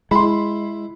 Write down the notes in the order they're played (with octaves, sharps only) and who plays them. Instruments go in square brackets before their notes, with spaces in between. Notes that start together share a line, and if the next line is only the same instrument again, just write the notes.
[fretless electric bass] G#3 [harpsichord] E4 [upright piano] B5 C6